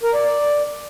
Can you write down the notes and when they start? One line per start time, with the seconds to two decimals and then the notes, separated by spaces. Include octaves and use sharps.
0.03 A#4
0.14 D5
0.25 D5